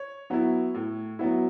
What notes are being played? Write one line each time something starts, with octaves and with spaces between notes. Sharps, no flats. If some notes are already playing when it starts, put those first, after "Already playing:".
Already playing: C#5
F#3 B3 E4
A2
F#3 B3 E4